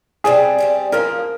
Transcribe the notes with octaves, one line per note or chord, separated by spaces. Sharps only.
C3 G3 C4 G#4
C3 G3 C4
F3 A#3 F4 G#4 A#4